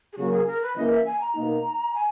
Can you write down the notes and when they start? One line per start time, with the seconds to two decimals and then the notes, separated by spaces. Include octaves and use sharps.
0.13 G#4
0.18 C#3 F#3 A#3 F#4
0.33 G#4
0.47 A#4
0.62 B4
0.76 C#3 E3 A#3 D#5
0.90 E5
1.06 G#5
1.21 A#5
1.35 B2 A#3 D#4
1.94 G#5